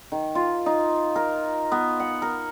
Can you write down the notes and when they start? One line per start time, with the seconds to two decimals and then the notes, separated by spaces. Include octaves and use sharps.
0.12 D#3
0.35 F4
0.66 D#4
1.16 A#4
1.72 B3
2.00 F#5
2.22 A#4